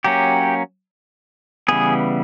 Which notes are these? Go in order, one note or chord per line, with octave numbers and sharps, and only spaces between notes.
F#3 A#3 C#4 G4
C#3 E3 G3 B3 G#4